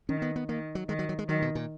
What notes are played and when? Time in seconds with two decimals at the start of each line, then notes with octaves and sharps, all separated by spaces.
0.09 D#3 C#4
0.22 B3
0.36 B3
0.49 D#3 A#3
0.75 F#3
0.89 D#3 G#3
0.99 F#3
1.09 F#3
1.19 G#3
1.29 D#3 F#3
1.42 B2
1.55 A#2